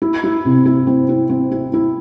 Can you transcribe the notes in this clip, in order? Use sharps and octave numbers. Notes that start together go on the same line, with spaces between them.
E4
E4
C3
E4
C4
E4
C4
E4
E4